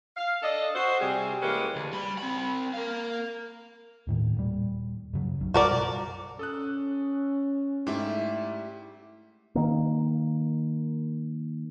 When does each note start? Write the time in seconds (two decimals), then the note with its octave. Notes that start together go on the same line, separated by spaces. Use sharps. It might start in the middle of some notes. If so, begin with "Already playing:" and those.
0.17 F5
0.43 D4 A4 D#5
0.75 F#4 C5
1.00 C3 G3 G#4
1.42 E3 G#3 A#3 C#4 G4 B4
1.76 D2
1.93 G3 B5
2.18 C4 B5
2.74 A#4 F5
4.07 D#2 A2 D#3
4.34 D#1 A#2 G3
5.13 F#2 C#3 F#3
5.41 B1 F#3
5.54 F#2 B2 G3 F#4 A#4 D5
6.39 C#4 A4 D#6 F#6
7.87 G#2 G3 A3 E4 G4
9.55 D#3 A#3